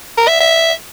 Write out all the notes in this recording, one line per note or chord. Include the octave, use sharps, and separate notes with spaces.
A#4
E5
E5